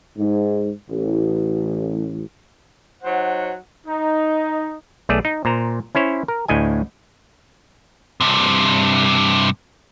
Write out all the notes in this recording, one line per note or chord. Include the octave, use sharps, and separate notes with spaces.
G#2
A1
F#3 D#4 C5 F#5
D#4
B1 A3 G#4 D5
D#4
A#2 C5 A#5
C#4 E4 C5 C#5
A#4
D2 A2 D#5 G#5
G2 C3